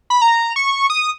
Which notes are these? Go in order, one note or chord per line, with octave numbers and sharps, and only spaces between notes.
B5
A#5
C#6
D#6